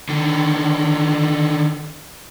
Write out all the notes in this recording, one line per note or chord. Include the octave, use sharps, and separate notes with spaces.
D3 D#3